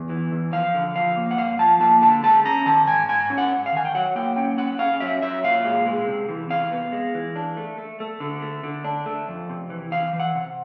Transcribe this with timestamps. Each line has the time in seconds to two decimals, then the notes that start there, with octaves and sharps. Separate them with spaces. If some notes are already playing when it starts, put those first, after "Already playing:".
Already playing: E2
0.09 E3
0.32 E2
0.53 F3 F5
0.74 D3
0.96 F3 F5
1.17 A#3
1.31 F#5
1.38 G2 F5
1.59 F3 A5
1.80 A#3 A5
2.02 D3 A5
2.23 G#3 A5
2.45 C#4 A#5
2.66 D#3 A5
2.87 G#2 G#5
3.09 G#2 G#5
3.30 C#4
3.38 F#5
3.52 G#2
3.66 F5
3.72 D#3 G#5
3.85 G5
3.95 F#3 F#5
4.15 A#3 G5
4.36 C#4 G5
4.58 C#4 F#5
4.79 C#4 F5
5.00 F#3 E5
5.22 F#3 E5
5.44 A#2 F5
5.65 G#3
5.86 G#3
6.07 C3
6.29 E3
6.50 C3 F5
6.71 B3
6.92 G#3
7.14 E3
7.36 D4
7.57 A3
7.78 A3
8.00 A3
8.20 D3
8.42 A3
8.63 D3
8.84 D4
9.06 A3
9.28 F2
9.49 C3
9.70 E3
9.92 E3 F5
10.13 E3
10.20 F#5
10.35 C3